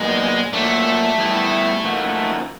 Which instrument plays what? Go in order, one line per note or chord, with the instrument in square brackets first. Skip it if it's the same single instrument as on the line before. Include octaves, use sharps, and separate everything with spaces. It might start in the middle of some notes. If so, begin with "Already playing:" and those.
Already playing: [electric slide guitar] A#2 F#3 B3 [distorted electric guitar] G#3
[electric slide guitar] A#2 F#3 A#3 D4 [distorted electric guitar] A3
[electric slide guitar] G3 B3 E4 G#4
C#3 F3 A#3 D#4 F#4